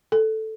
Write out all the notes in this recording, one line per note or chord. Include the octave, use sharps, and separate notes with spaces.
A4